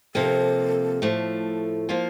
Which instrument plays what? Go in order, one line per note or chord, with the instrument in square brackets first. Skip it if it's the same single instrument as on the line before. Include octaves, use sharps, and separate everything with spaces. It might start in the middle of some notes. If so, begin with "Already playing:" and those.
[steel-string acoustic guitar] C3 F3 A#3 [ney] A4
[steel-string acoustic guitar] A2 F3 A3
F3 A#3 F4